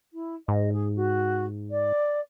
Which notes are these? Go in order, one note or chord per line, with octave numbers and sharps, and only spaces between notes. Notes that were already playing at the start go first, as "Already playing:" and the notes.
E4
G#2 D#5
G#4
F#4
D5